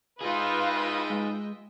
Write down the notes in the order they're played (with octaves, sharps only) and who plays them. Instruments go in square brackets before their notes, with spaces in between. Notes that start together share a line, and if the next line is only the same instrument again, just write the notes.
[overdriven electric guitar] D#4 G#4 [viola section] F4 B4 [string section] D#5 E5 G5
[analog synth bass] G#3